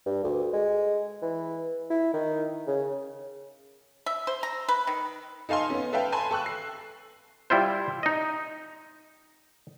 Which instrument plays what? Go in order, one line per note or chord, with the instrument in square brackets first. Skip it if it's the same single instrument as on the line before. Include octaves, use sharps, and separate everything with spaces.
[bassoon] G2
D2
G#3
E3
E4
D#3
C#3
[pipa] E5
C5
A#5
B4
D#3
[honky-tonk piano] D#4 A4 F5 G#5 C6
B3 C#4
A4 B4 E5 F5 G5
G#5 A5 B5 C6
A4 G5 C#6 E6 F#6
C7
[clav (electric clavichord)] G3 E4 F4 C5
D#4 D#5